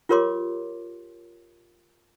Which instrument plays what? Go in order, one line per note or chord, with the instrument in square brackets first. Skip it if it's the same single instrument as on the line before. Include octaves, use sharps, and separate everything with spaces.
[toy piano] F4 G4 A#4 C#5 C6 D6